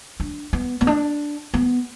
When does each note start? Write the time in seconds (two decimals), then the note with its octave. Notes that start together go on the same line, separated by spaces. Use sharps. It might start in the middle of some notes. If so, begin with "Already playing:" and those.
0.20 D4
0.53 B3
0.81 B3
0.87 D4
1.54 B3